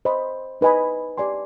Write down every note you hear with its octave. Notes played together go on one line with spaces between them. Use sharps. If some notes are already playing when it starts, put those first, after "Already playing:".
C5 D#5 B5
D#4 B4 D#5 G#5 B5
G4 D5 G#5 C6